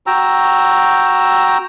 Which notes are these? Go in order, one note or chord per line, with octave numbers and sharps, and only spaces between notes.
F#4 G5 A#5 E6